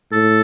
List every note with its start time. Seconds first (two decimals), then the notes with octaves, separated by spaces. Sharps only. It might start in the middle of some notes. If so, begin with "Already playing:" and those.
0.12 A2 A4